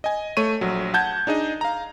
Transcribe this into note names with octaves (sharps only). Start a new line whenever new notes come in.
D#5 G#5
A3 C#5 C#6 D#7
A#1 F#3
F#5 A5 G6 G#6
D4 D#4 G#4 D#5
F5 A#5